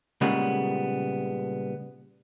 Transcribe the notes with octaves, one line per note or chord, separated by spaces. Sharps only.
A#2 C#3 G3 G#3 B3